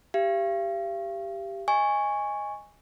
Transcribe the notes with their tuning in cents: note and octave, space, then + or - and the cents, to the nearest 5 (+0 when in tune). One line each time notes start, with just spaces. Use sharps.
G4 +0 F5 -40
D#5 +0 G#5 -10 C#6 +0